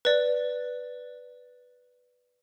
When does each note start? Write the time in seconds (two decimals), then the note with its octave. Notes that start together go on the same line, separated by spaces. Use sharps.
0.05 B4 D5